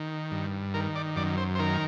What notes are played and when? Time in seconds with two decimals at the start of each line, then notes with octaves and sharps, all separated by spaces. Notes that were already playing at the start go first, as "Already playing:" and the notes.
Already playing: D#3
0.31 G2
0.74 D#3 A#4
0.96 D5
1.16 F#2 D5
1.37 C5
1.55 C5
1.59 D#3 A#4